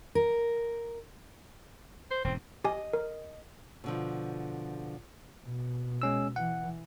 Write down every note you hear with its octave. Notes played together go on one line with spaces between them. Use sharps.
A#4
C5
E1 G#2 C4
G4 D#5 G#5
A#4
B2 D3 F3
B2
G#3 C#4 E6
E3 F#5